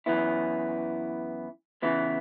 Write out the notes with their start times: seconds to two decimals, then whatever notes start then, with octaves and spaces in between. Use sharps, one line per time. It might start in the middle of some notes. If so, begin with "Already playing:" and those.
0.06 F#2 E3 B3 E4
1.82 C#3 E3 B3 E4